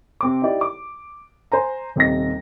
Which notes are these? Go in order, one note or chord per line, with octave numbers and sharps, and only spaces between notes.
C3 C4 D6
D#4 E4 G4 D5
D6
C5 G#5 A#5
D#1 C3 D#4 A#6